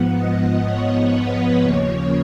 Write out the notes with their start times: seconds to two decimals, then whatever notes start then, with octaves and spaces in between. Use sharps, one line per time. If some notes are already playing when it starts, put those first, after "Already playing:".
Already playing: G#2 F3 B3 F#5
0.16 D#5
0.65 C#5
1.14 B4
1.62 D#2 C#3 F3 A#3 C#5